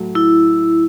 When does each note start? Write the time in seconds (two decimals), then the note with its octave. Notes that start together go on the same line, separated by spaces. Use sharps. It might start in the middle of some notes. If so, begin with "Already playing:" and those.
Already playing: A2 F#3 A3
0.15 E4